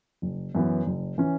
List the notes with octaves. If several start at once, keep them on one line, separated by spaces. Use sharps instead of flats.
F#1
F#2 E3 B3
F#1
E3 C#4